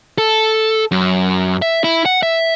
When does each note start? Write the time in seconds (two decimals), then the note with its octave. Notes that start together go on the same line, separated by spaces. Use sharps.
0.18 A4
0.92 F#2
1.62 E5
1.84 E4
2.06 F#5
2.23 E5